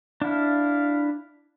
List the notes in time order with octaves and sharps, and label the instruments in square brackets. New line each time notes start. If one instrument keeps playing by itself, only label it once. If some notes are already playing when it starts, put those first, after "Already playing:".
[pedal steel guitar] D4 E4 [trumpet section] F5